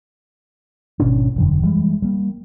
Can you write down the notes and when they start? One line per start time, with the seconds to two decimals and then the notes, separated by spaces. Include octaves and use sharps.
1.00 G#1 B2 C#4 D4
1.36 E1 F#2 D3
1.63 E3 G3 G#3
2.02 G3 A#3